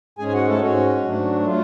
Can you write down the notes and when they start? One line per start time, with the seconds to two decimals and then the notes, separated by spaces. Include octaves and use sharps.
0.18 G#2 G#3 C#4 G#4 G#5
0.28 G#5
0.33 F#4 F#5
0.48 A3 A4
0.61 G#2 G#3 C#4 F#4
1.04 G#2 F#3 A3 D4
1.46 F#3 A3 F4